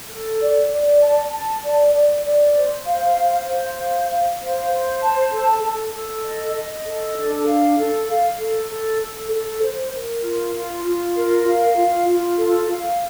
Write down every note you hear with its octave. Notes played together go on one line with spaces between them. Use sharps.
A4
D5
D5
A5
A5
D5
D5
D5
C5
F5
C5
C5
F5
F5
C5
C5
A5
A4
A4
A4
D#5
D#5
A4
D4
F5
A4
F5
A4
A4
A4
A4
C5
A#4
F4
F4
F4
A#4
F5
F4
F4
A4
F5